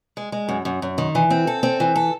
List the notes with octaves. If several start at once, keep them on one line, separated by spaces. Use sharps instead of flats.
G#3
G#3
F#2
F#2
F#2
D#3
E3
C4
A4
C4
E3
A4